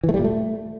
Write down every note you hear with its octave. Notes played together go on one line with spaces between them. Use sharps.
E3
A3
G3
A#2
A3